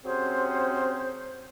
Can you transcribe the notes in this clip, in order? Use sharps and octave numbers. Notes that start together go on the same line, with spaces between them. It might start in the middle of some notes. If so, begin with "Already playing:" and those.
C3 F#3 C4 C#4 G#4 C5